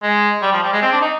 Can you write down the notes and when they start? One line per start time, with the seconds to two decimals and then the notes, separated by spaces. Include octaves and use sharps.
0.03 G#3
0.42 G3
0.53 F3
0.63 G3
0.73 G#3
0.82 C4
0.92 D4
1.01 D#4